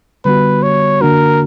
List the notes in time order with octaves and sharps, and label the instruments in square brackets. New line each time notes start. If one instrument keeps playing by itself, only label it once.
[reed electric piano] D3 G3 B3 F#4 [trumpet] B4
[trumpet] C#5
[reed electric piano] D3 A#3 D4 F#4 [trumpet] A#4